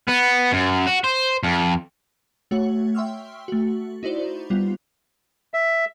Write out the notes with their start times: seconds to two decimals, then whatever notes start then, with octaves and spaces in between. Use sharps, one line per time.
0.08 B3
0.52 F#2
0.87 F#4
1.04 C5
1.43 F2
2.51 A3 F#4 C#5 F#5
2.95 E5 G5 C6 C#6 E6 F6
3.48 A3 F#4
4.03 D#4 E4 F#4 C5 D5
4.50 G3 B3 F4
5.54 E5